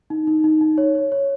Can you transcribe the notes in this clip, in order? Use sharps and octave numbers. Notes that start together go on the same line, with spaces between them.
D#4
D#4
D#4
D#4
C#5
C#5
C#5